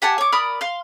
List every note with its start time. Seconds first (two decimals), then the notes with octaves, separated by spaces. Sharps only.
0.02 G4 F#5 G#5 A5
0.18 C#5 D6
0.32 A#4 D5 B5 D#6
0.61 F5 C6 F6